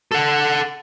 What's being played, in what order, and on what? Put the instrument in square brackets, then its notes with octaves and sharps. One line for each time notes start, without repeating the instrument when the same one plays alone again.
[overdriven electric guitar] A4 F#5